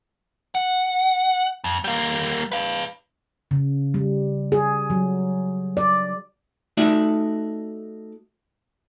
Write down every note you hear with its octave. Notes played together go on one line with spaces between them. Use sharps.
F#5
F2
G3 A#3
B4 F5
C#3
G3
G#4
F#3
D5
A3 D#4 F#4 D5 E5